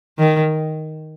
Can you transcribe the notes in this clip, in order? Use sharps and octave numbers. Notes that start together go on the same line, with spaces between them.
D#3